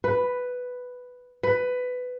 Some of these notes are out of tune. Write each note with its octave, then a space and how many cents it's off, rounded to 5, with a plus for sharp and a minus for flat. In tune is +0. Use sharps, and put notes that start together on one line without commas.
B4 +5
B4 +15